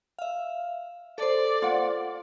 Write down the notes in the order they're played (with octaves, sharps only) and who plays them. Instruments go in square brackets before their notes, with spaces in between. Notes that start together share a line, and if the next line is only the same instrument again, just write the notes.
[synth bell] E5 F5
[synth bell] A4 C5 [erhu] D5
[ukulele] F4 F#5